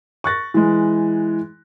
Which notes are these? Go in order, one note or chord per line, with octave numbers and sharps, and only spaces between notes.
C#6 F#6 A6 A#6
E3 G#3